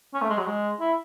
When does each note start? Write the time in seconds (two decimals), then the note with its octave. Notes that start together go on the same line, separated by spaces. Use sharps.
0.14 C#4
0.22 A3
0.29 G#3
0.38 F#3
0.46 G#3
0.80 E4